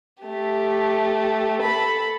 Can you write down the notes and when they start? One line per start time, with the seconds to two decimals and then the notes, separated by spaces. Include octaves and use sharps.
0.23 A3 G4
1.62 A4 B5